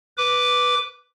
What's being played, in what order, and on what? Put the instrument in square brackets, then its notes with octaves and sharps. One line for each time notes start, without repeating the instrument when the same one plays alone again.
[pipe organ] B4 D6